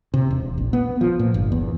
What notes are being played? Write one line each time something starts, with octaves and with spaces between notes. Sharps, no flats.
C3
E1
A#1
B3
F3
A#2
G1
E2